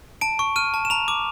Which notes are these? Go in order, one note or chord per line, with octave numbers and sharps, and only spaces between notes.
A5 D7
C#6
F6 D#7
A5
E7
A#5 F7
D6